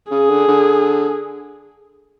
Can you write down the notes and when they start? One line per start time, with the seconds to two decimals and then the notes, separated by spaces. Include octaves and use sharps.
0.11 C#3 G#4
0.30 D3
0.48 D3